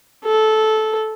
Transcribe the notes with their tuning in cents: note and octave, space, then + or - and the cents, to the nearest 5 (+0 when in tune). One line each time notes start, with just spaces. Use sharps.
A4 -15